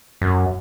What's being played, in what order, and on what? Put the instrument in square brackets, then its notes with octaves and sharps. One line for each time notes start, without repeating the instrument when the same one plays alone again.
[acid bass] F#2